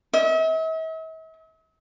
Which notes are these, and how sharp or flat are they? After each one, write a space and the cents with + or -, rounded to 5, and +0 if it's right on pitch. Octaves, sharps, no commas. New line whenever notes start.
E5 -45